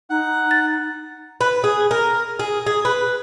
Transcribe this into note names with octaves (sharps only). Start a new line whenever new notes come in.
D#4 F#5
A6
B4
G#4
A#4
G#4
G#4
B4